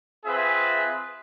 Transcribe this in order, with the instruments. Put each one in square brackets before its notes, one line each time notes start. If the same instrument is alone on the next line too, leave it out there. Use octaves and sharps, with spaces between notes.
[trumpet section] C4 F4 G#4 B4 E5